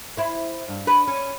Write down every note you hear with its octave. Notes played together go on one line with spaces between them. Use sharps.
E4 C5
G2
B4
C#4